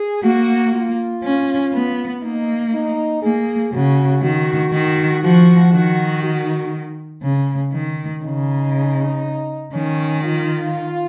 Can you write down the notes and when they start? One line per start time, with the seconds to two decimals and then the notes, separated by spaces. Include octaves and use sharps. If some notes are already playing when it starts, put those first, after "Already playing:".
Already playing: G#4
0.23 A#3 F#4
0.73 F4
1.23 C#4
1.73 B3
2.23 A#3 D#4
2.73 D#4
3.23 A#3 G#4
3.73 C#3 F#4
4.23 D#3 F#4
4.73 D#3
5.24 F3 F#4
5.73 D#3 F#4
6.24 F#4
7.23 C#3
7.73 D#3
8.23 C#3 D#4
9.74 D#3 C#4
10.23 F4